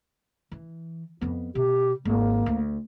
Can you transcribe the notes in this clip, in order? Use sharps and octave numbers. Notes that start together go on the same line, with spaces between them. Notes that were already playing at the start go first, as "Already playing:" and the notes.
E3
F2 B3
B2 G4
G#1 A#3
D2